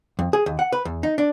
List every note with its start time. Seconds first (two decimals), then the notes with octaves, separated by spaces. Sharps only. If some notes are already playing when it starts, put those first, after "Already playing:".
0.19 F2
0.33 G#4
0.46 D#2
0.59 F#5
0.72 B4
0.85 E2
1.03 D#4
1.18 D4